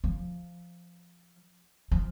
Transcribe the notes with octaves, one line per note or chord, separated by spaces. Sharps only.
F3
F3